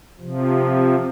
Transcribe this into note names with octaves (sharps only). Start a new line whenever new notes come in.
C3 F3